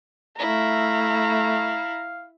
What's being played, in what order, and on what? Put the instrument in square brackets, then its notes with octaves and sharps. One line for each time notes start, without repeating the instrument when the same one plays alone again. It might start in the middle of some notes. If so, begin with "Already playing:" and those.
[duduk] A3 [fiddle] E4 [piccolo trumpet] F5 [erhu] A#5